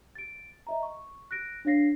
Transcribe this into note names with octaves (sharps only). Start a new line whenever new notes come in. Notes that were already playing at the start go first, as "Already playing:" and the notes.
A6 D7
D#5 E5 A#5
C#6
F#6 A#6 D7
D4 C#5 F5 A#6 C7